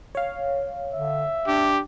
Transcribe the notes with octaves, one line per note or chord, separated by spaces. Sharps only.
C#5 F5
D3 E5
D4 G4